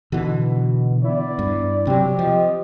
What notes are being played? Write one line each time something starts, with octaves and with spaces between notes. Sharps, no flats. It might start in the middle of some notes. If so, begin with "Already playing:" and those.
B2 D3 E3
B3 E4 D5
G2
C3 F#3 C4 G4
F3 D#5